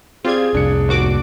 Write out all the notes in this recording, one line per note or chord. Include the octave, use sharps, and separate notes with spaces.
C4 F4 G4 G#4 D5 G#6
C2 F2 C3 D4 C#7
D#2 F#4 D6